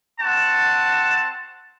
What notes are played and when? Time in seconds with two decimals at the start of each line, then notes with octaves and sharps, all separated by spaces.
0.20 C4 F#4 F#5 A5